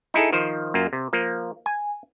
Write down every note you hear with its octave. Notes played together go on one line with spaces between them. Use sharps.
D#4 E4 G#4 A4
D#3 F3 C5
F#2 A#3 F4
C3
F3 A#3
G#5